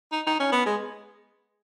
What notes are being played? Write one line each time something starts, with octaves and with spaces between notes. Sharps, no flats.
D#4
D#4
C#4
B3
G#3